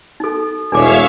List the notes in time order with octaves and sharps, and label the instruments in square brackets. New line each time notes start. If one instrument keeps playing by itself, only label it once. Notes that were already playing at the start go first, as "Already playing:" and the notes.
[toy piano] D#4 A4
[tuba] E1 [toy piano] D4 A4 D6 [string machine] C#5 E5 F5